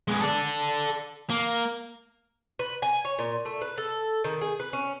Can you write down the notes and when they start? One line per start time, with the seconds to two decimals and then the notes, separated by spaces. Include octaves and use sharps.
0.08 G#3 B3
0.21 A4 D5
1.30 A#3
2.59 B4
2.82 G#5
3.05 C#5
3.19 A#2
3.45 A3
3.62 B4
3.78 A4
4.24 D#3
4.41 G#4
4.59 B4
4.73 C#4